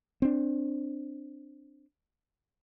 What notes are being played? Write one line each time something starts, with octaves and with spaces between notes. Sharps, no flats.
C4 D4